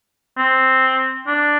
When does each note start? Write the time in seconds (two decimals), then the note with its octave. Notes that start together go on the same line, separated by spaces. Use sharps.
0.38 C4
1.27 D4